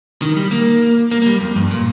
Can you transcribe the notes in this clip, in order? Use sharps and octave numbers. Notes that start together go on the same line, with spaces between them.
D#3
G3
A#3
A#3
A#3
G3
F2
G2
A#2